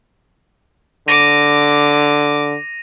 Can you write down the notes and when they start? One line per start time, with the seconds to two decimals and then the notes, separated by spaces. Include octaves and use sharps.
1.08 D3 D6 A#6 D#7 F7